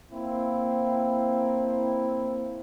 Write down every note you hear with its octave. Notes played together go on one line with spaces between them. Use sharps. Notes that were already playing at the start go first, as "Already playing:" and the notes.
A#3 C4 E4